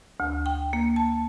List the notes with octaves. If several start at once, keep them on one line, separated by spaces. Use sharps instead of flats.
D2
G5
A#3
A5